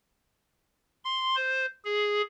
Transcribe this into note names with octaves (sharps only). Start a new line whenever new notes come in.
C6
C5
G#4